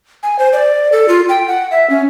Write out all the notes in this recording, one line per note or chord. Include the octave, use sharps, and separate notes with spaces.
G#5
C5
D5
A4
F4
G5
F#5
E5
C#4